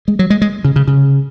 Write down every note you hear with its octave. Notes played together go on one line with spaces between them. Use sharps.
G#3
F#3
G#3
G#3
C#3
C#3
C#3